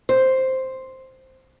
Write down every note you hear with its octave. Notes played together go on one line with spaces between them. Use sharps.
C5